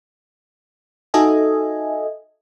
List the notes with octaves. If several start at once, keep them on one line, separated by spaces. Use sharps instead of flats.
D#4 F#4 A4 D#5 E5 G#5